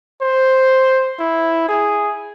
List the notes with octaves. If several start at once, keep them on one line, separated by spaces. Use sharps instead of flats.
C5
E4
G#4